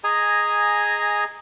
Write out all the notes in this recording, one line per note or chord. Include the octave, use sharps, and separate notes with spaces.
G#4 D#5 G#5 A#5